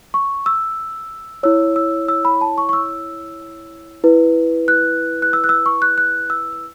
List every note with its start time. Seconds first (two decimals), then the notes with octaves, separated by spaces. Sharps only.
0.14 C#6
0.46 E6
1.43 E4 C#5 E6
1.76 E6
2.08 E6
2.25 B5
2.41 A5
2.58 C#6
2.69 C#6
2.73 E6
4.04 E4 B4
4.68 F#6
5.22 F#6
5.33 E6
5.44 F#6
5.49 E6
5.66 C#6
5.82 F#6
5.98 F#6
6.30 E6